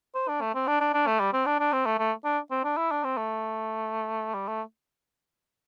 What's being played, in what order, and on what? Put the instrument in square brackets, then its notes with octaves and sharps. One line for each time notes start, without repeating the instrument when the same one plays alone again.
[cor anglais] C5
D4
A3
C4
D4
D4
D4
A3
G3
C4
D4
D4
C4
A3
A3
D4
C4
D4
E4
D4
C4
A3
G3
A3